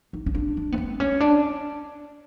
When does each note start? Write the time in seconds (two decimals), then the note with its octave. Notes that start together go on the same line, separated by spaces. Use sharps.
0.13 D#4
0.26 C#4
0.34 D4
0.57 D4
0.72 B3
0.78 C4
1.00 C#4
1.20 D4